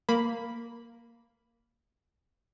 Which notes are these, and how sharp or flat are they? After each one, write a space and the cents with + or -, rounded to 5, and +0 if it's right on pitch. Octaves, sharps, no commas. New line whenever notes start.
A#3 +0 B5 +0